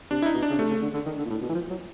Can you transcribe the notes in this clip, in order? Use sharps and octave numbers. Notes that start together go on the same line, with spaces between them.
C3 D4
E4
D#4
B2
D4
C#3
C3 A3
C#3
D3
D3
D#3
D3
A#2
A2
B2
E3
F3
F#3